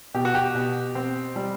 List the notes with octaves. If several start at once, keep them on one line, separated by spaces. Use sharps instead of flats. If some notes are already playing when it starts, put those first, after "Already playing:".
B2 G4
F#4
G4
B2
C4
G3